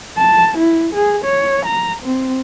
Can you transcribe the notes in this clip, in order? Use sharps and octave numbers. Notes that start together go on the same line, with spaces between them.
A5
E4
G#4
C#5
A#5
C4